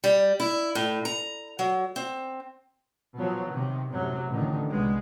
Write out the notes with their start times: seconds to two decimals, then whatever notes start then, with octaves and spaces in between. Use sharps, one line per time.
0.04 G3
0.40 E4
0.75 A2
1.05 A#5
1.59 F#3
1.96 C4
3.17 B2 F3 F#3
3.48 C3 D#3
3.91 F#2 A2 C3 F#3
4.28 A1 A2 D3 D#3
4.71 C2 G#3 B3